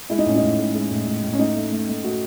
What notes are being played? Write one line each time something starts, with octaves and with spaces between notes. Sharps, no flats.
G#3 E4
D#4
A2 C#4
D#4
A2
G#3
G#3
A2
A2
A2
C#4
A3 D#4
A3
A3
A3
A3 F#4